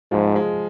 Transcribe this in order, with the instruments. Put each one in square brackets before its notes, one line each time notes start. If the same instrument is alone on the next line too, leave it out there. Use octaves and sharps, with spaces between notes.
[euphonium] G#2 [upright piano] F3
[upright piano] G#3